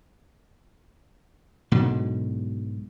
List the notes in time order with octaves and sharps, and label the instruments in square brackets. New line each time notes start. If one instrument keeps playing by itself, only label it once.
[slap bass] B1 G#2 B2 D3